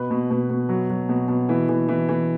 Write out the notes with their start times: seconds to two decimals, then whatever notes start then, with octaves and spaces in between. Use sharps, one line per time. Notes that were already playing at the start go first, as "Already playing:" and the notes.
Already playing: B2 B4
0.10 B2
0.30 B2
0.50 B2
0.69 F#3
0.90 F#3
1.09 B2
1.28 B2
1.49 E3
1.69 E3
1.89 E3
2.09 E3